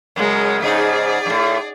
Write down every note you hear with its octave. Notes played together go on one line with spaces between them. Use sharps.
F#2 C#3 G#3 A#4
G#2 C#3 D#4 G#4 D5
F#2 A2